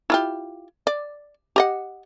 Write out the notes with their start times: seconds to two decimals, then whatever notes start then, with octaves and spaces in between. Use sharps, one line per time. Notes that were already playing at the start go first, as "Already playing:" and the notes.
0.10 E4 F4 G4
0.87 D5
1.56 G4 D#5 F#5